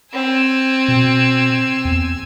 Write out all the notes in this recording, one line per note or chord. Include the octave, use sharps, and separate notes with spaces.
C4 G#5 E6
B2
E2